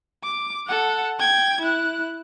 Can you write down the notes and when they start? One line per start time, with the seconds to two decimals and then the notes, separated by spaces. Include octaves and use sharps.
0.23 D6
0.67 A4 F#5
1.19 G5 G#6
1.61 E4 F#6